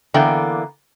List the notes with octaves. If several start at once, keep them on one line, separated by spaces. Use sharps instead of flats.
D3 E3 A#3 B3 G5